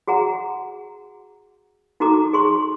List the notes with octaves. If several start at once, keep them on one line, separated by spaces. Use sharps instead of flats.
F#4 G#4 F#5 A#5
D#4 F#4 A4 A#5 D6
G#4 C6 C#6